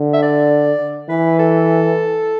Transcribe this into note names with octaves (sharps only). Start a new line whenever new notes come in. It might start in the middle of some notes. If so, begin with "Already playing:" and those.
Already playing: D3
E5
D5
E3 B4
A4